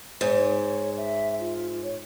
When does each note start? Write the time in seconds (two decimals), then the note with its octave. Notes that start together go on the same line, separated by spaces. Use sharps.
0.21 G#2 C#5
0.97 E5
1.39 F4
1.83 C#5